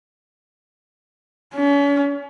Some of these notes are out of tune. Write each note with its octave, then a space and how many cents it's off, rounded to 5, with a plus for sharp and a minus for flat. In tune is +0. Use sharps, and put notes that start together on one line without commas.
C#4 +40